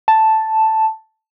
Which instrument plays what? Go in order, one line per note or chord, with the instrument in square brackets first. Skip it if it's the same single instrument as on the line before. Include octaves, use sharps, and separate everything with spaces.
[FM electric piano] A5